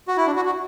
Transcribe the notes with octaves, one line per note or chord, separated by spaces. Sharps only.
F#4
E4
D4
F#4
F#4